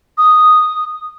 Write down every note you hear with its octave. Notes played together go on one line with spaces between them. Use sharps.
D#6